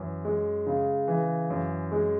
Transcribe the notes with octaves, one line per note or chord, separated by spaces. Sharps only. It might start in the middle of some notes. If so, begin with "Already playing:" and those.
Already playing: F#2 E3
G#3
C#3
E3
F#2
G#3